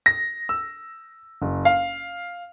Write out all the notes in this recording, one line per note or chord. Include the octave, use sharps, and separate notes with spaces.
A#6
E6
F#1
F5